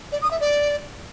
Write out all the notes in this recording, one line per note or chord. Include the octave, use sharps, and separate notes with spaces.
D5
D#6
E5
D5